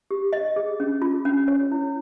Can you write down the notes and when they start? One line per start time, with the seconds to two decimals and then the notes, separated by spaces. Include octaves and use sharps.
0.11 G4
0.33 D#5
0.56 G#4
0.80 C#4
1.02 F4
1.25 C#4
1.48 C#5
1.72 E4